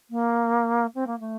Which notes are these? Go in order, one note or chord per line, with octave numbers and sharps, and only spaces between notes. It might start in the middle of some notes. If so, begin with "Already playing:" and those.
A#3
C4
A#3
A3